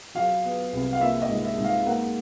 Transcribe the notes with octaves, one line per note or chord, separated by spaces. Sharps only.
F#3 F5
B3
C2
F5
A#3 E5
D#5
G#2
E5
G#2
F5
A#3 F#5